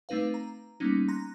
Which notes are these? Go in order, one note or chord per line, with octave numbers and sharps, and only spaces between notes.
A3 C4 D#4 B4 F5
A#5
G3 A#3 B3 C#4 D#4
A#5 C6 F#6 A#6